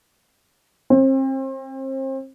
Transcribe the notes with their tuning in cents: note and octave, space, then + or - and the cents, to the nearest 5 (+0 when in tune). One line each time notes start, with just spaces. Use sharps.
C4 +35